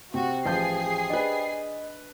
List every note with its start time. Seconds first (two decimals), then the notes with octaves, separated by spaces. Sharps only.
0.14 C3 F#4 G4 C5 G5
0.46 A1 F3 G#4 G6 C7
1.10 D4 B4 D#5